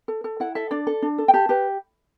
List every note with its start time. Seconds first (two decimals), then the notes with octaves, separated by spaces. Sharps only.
0.08 A4
0.24 A4
0.40 E4 F#5
0.55 A4 E5
0.71 D4 D5
0.87 A4
1.02 D4
1.18 A4
1.28 G5
1.34 G4 A5
1.49 G4 B4